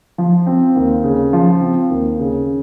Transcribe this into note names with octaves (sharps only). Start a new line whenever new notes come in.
F3
C4
D#2
C#3
F3
C4
D#2
C#3